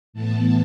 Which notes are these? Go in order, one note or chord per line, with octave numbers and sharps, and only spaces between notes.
A2 E3 B3 A5